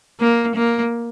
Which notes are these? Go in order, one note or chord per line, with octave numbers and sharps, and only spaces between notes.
A#3
A#3